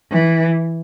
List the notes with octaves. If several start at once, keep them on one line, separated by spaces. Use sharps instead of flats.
E3